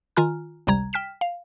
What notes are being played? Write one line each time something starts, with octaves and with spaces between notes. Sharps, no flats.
D#3 F4 G#5 A#5 F6
G#1 C#2 C3 G3 A#5 G#6
G5 F6 B6 E7
F5